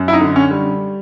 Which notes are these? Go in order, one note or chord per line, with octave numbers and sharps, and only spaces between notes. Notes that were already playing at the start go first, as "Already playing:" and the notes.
Already playing: F#2
E4
D#4
D3
C#4
G3